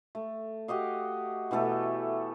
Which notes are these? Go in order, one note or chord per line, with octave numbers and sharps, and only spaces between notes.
A3
F#4 G4 D#5 F5
B2 E3 A3 A4